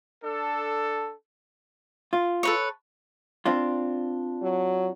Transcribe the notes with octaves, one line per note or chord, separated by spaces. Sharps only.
D4 A4
F4
A4 B4 C#5
C4 D4 F4
F#3